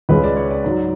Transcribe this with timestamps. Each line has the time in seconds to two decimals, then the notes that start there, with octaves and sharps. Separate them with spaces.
0.09 C#2 C#3 G#3 B4
0.24 D5
0.37 C#5
0.51 D5
0.65 G#2 F#3